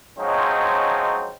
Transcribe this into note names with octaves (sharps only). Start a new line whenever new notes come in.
F3 F#3 G#3 C4 C#4 D#4